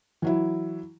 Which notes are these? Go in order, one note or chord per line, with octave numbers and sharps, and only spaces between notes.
E3 F#3 E4